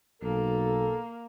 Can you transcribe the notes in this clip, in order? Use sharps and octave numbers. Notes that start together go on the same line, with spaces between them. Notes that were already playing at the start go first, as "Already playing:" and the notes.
B1 A#3 A4